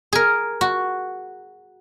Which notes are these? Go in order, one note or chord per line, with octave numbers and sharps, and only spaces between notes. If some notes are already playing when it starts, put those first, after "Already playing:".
G#4 A#4
F#4